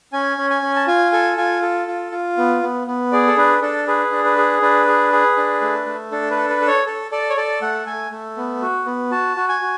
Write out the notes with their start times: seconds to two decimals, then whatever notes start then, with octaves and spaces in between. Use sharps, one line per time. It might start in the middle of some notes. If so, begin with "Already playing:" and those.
0.12 C#4 G#5
0.38 C#4
0.50 G#5
0.62 C#4
0.76 A5
0.87 F4 G#5
1.12 A4 G#5
1.37 F4 G#5
1.62 A4
1.88 F4
2.12 F4
2.37 B3
2.63 B3
2.87 B3
3.12 G#4 D5
3.27 A4
3.37 D4 B4
3.62 D4 A4
3.87 G#4 B4
4.12 D4
4.25 B4
4.37 G#4
4.62 D4 B4
4.87 G#4
5.12 G#4
5.37 D4
5.62 A3
5.86 A3
6.12 D4 A4
6.31 B4
6.36 A4
6.50 B4
6.61 A4
6.67 C#5
6.86 A4
7.11 A4 D5
7.30 C#5
7.37 A4 D5
7.62 A3 F#5
7.86 A3 G#5
8.11 A3
8.37 B3
8.62 F#4
8.86 B3
9.11 F#4 A5
9.37 F#4
9.49 G#5
9.62 F#4